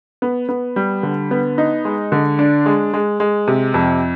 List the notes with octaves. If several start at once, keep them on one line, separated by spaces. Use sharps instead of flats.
B3
B3
G3
D3
B3
D#4
G#3
D3
D4
G#3
G#3
G#3
C3
F2